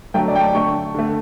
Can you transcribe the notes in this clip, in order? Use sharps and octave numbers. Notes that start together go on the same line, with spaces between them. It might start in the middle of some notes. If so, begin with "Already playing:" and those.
D3 F#3 A3 G5
D5
G5
A5
D3 A3 C#6
D3 A3